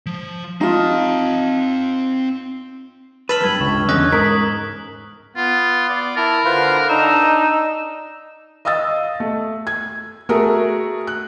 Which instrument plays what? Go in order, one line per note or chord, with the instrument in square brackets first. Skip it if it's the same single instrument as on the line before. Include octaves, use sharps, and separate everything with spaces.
[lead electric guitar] F3
[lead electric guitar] C4 A5 [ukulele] D#4 F4
[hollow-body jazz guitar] B4 [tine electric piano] A5 B5 B6 [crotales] E6 F6 F#7
[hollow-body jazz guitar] E2 G2 [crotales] E6 G#6
[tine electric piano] C#2 [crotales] C#6
[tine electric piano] E2 D3 D#5 [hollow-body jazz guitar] C#4 [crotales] F#6
[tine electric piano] G#2 [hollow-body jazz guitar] A#4 [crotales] D#6 B6
[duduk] B3 [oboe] F4
[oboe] D5
[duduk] E4 [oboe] A#4 [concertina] A5
[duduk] D3 [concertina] F4 B4 C5
[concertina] D4 A#5 [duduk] D#4 [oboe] E6
[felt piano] D#5 F5 D#6 E6 A6
A3
G#6
A3 F#4 G#4 A#4
F#6